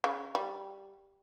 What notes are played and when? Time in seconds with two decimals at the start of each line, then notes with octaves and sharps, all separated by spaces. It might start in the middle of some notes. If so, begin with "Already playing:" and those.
0.04 C#3
0.35 G3